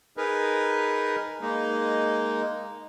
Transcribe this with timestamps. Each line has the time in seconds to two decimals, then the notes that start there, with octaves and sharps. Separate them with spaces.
0.17 D#4 G#4 A#4 B4
1.41 G#3 A#3 D#4